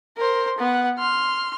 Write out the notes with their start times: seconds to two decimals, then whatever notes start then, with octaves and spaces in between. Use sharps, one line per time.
0.17 A#4 C5
0.59 B3 F#5
0.98 C6 F6